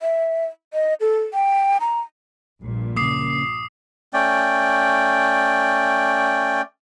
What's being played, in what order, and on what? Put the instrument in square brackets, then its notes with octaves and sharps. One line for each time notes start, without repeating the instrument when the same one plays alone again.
[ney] E5
D#5
A4
G5
A#5
[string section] A#1 G2 A#2
[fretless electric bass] C#3 A#3 [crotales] D6 D#6 C7
[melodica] A3 C#4 D5 G5